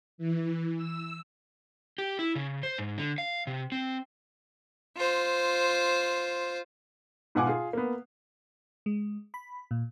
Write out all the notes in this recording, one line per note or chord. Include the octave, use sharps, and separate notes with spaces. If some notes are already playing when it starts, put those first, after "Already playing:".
E3
E6
G4
E4
C#3
C5
G#2
D3
F5
C3
C4
F4 C5
G#2 B2 F4 F#5 G#5 D6
F4 G#4
A#3 B3
G#3
B5
A#2